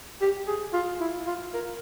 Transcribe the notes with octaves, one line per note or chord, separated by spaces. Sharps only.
G4
G#4
F4
E4
F4
A#4